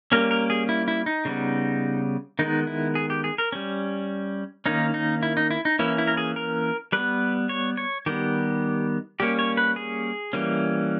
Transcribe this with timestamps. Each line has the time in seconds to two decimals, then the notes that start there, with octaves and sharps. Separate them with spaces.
0.12 G3 A#3 C#4 A#4
0.31 A#4
0.50 G#4
0.69 E4
0.88 E4
1.06 D#4
1.25 C#3 G3 B3
2.39 D#3 G#3 B3 D#4
2.67 E4
2.95 G#4
3.10 G4
3.24 G#4
3.38 A#4
3.52 G3 C#4
4.66 D#3 A#3 C#4 D#4
4.94 D#4
5.23 E4
5.37 D#4
5.51 E4
5.65 D#4
5.79 E3 A#3 C#4 E4
5.98 E4
6.07 A#4
6.17 G#4
6.36 A#4
6.92 G3 B3 B4
7.49 C#5
7.77 C#5
8.06 D#3 G3 B3 G4
9.20 G3 A#3 C#4 G4
9.39 C#5
9.57 B4
9.76 G#4
10.33 E3 G3 A#3 C#4